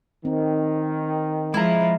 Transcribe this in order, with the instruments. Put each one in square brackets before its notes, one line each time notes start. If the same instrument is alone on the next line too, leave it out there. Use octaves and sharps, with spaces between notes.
[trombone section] D#3 [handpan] C4
[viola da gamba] F3 [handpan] G#3 [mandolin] E4 A#5